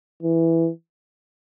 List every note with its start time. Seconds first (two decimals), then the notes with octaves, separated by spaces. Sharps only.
0.22 E3